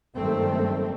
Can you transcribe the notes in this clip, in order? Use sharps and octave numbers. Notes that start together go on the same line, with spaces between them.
F#1 G2 D#3 G3 A3 C4